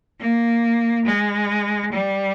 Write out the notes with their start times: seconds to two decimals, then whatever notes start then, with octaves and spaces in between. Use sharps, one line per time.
0.20 A#3
1.06 G#3
1.92 G3